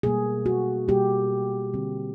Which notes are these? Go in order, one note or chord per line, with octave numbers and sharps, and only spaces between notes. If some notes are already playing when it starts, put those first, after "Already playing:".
B2 G3 A#3 G#4
F#4
B2 G3 A#3 G4
D3 G3 C4